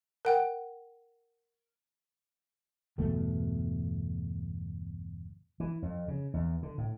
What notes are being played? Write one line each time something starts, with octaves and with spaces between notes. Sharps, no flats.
A#4 F#5 G5
G1 E2 B2 A3
E3
F2
C#3
E2
D3
A2